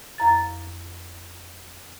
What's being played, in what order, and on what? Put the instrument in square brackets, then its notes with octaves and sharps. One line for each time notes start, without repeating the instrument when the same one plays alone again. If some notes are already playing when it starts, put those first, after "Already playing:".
[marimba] F2 A#5 A6